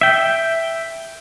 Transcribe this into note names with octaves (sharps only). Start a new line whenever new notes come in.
E5 G5